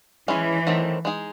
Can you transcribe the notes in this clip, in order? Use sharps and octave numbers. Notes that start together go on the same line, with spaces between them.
E3 G#3 C#4 E4 G#4
D#3 F#3 A3 C4
G#3 D#4 G#4